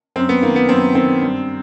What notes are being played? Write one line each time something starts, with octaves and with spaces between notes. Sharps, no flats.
F#2 C4
B3
D#3 A#3
B3
F#2 C4
D#3 C4
G2